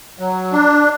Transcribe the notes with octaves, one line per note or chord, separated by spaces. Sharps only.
F#3
D4